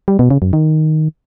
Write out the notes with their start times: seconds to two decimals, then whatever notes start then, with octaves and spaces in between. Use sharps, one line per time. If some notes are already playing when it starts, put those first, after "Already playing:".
0.08 G3
0.19 B2
0.30 C#3
0.42 F#2
0.53 D#3